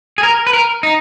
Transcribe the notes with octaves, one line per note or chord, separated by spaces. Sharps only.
G#4
A#4
B4
A#4
D#4